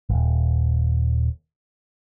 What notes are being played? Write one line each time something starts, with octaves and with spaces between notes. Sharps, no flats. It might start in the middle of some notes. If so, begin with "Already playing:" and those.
D#1 G#1